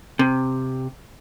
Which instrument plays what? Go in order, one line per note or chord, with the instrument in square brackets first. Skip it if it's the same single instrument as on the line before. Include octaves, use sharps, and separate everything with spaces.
[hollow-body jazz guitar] C3